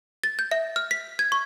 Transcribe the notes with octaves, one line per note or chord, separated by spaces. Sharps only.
A6
G6
E5
F6
B6
G#6
C#6